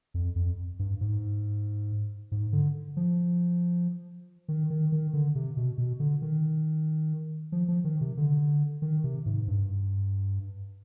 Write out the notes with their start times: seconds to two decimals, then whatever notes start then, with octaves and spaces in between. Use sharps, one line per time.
0.14 F2
0.36 F2
0.79 G2
1.01 G#2
2.32 G#2
2.53 D3
2.97 F3
4.48 D#3
4.70 D#3
4.92 D#3
5.13 D3
5.35 C3
5.57 B2
5.78 B2
6.00 D3
6.22 D#3
7.52 F3
7.68 F3
7.84 D#3
8.01 C3
8.17 D3
8.82 D#3
9.04 C3
9.26 G#2
9.48 G2